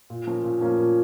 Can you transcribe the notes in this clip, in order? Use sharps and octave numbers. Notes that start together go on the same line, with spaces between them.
A#2
F3 A#3 C#4
A#2
F3 A#3 C#4
A#2